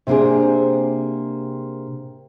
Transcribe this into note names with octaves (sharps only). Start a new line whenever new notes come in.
C3 A#3 C4 D4 G#4